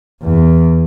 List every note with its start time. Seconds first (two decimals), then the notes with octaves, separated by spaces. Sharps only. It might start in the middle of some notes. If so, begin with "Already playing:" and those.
0.23 E2